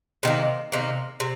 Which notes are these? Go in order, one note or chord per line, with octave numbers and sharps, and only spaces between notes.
C3 D#3 A#3
C3 D#3 A#3
C3